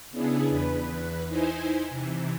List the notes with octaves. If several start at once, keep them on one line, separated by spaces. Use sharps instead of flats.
C#3 B3 D4 E4 G#4
E2 B4
D#4 E4 C5 G#5
C3 E3